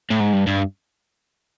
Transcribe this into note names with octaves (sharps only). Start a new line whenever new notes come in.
A2
G#2
G2
G2